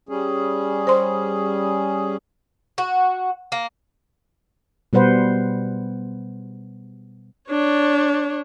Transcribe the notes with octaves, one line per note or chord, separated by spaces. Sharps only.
G3 C#4 G#4
C5 C6
F#4
A#3
B2 G3 B4 C5 F#5
D4 C#5